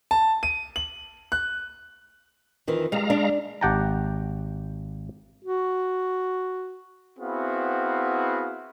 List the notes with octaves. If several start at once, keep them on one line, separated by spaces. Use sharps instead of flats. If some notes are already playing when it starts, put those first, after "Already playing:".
A5
D#7
F#7
F#6
F2 D#3 E3
G3 G#3 F5 A#5
D4
G#1 G4 F#5 G5 A5 A#5
F#4
B3 C4 E4 F#4 G#4 F5